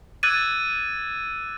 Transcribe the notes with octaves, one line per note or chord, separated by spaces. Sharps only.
D6 E6 F#6 G#6 A6 D#7